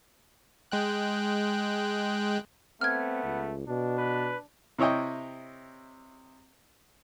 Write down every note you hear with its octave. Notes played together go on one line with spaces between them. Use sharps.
G#3 G5 F#6
A3 B3 C4 F6 G#6
C#2
B2 D4
B4
C3 E4 C#5 D#5 G5